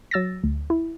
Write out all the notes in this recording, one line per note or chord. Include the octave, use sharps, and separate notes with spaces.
F#3 E6 A6 A#6
D2
E4